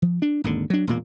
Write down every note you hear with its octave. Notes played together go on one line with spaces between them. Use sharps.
F3
D4
G#1 D#2 D3
F#3 D4
E1 A#2 A#3